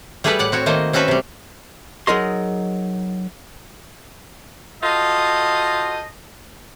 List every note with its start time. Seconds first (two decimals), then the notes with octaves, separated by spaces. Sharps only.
0.24 G3 A3 G#4 A4 B4 D5
0.39 A2 D5 F#5
0.52 C4 F#4 C#5
0.66 D#3 A3 A#3 C5 D#5
0.93 C4 C#4 F#4 A4 B4 E5
1.08 C3 G3
2.07 F#3 D#4 G#4 A#4 D#5 C6
4.81 F4 F#4 A4 C5 D#5